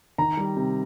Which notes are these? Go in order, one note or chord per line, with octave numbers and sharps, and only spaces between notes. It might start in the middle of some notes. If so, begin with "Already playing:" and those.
D#3 A#5
G3
C3